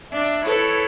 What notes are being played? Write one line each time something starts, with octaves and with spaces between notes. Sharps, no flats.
D4 E5
E4 A4 B4 C#5